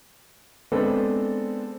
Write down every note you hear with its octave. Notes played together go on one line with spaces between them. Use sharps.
G#3 B3 C4 D4 A4 B4